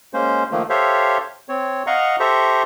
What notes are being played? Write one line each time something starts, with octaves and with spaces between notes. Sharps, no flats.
G#3 A#3 C#4 C5
D#3 F3 A3 A#3
G4 A4 C5 C#5 E5 F5
C4 C#5
D#5 F5 F#5 A#5 C#6
G4 A4 C5 E5 A#5 C#6